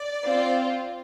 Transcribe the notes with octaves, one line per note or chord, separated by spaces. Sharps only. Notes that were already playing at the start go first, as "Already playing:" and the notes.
Already playing: D5
C4 F4